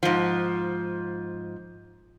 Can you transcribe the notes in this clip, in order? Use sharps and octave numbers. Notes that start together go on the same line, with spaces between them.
G#2 F3